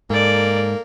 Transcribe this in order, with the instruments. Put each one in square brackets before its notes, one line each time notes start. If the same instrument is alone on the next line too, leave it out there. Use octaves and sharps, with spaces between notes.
[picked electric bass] G#2 [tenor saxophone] A#3 [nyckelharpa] A4 D5